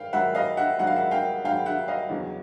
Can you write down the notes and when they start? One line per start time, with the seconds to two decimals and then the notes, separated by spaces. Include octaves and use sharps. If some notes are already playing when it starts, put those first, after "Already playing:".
Already playing: D#3 F5 G5
0.13 G#2 D#3 F#3 E5 F#5
0.35 D#5 F5
0.57 E5 F#5
0.78 G#2 D#3 F#3 F#5
0.87 F5
0.96 E5 F#5
1.11 F5 G5
1.44 G#2 D#3 F#3 F5 G5
1.66 E5 F#5
1.88 D#5 F5
2.10 E2 C#3 F#3